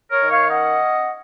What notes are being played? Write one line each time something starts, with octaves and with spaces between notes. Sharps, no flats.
A#4 C#5
D#3
C#5 F5
C#4 D#5 F#5